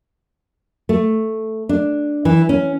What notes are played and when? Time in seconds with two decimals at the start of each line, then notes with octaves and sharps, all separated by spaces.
0.89 A3
1.69 D4
2.25 E3
2.49 C#4